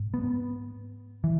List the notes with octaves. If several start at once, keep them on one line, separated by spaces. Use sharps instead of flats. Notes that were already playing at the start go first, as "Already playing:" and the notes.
Already playing: G#2
B3
E3